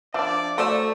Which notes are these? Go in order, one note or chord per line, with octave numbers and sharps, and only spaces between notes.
F3 D4 D5 E5 F5 D6
A3 F#4 C5 D5 E6